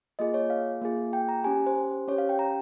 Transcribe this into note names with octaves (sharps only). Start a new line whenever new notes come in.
A#3 F4 G#4 D#5
C#5
F5
A#3 F4 G#4
G5
A#5
C#4 G4 G#5
C5
C#4 G4 C#5
F5
G5
A#5